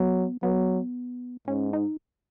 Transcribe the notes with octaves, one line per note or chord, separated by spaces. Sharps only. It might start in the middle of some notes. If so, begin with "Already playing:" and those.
Already playing: F#3 B3
F#3 B3
G#2 C#4
D#4